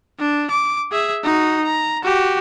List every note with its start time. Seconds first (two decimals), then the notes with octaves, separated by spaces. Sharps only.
0.20 D4
0.51 D6
0.92 G#4 E5
1.24 D#4 F#4
1.64 A#5
2.03 F#4 G4